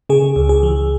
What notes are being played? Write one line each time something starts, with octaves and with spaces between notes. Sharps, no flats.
C#3 G#4
C#2
G#4
E3